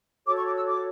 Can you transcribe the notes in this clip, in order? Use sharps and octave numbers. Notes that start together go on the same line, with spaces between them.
F#4 A4 C#5 D6
C#6
D6
E6
D6